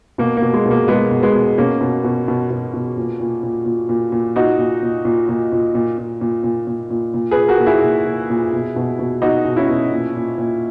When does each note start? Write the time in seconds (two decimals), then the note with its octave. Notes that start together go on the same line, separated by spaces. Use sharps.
0.18 B2 A#3
0.37 A#3
0.42 B2
0.54 G#3
0.66 B2
0.71 A#3
0.88 B2 G#3 B3
1.11 B2
1.23 G#3 B3
1.35 B2
1.58 B2 A#3 C#4
1.81 B2
2.04 B2
2.28 B2
2.51 B2
2.73 B2
2.97 A#2
3.20 A#2
3.43 A#2
3.66 A#2
3.89 A#2
4.12 A#2
4.36 A#2 D#4 F#4
4.59 A#2
4.83 A#2
5.05 A#2
5.29 A#2
5.52 A#2
5.75 A#2
5.98 A#2
6.21 A#2
6.44 A#2
6.67 A#2
6.90 A#2
7.14 A#2
7.31 G#4 B4
7.37 A#2
7.48 F#4 A#4
7.60 A#2
7.67 E4 G#4
7.83 A#2
8.06 A#2
8.30 A#2
8.53 B2
8.76 B2
8.99 B2
9.22 B2 D#4 F#4
9.45 B2
9.57 C#4 E4
9.69 B2
9.91 A#2
10.16 A#2
10.38 A#2